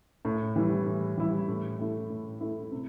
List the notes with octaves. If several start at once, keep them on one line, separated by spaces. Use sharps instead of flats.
A2
E3 G3 E4
A2
E3 G3 E4
A2
A3 E4
A2
A3 E4
C3